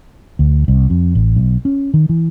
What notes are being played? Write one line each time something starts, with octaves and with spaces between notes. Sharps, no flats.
D2
C2
F2
A1
B1
C#4
D#3
E3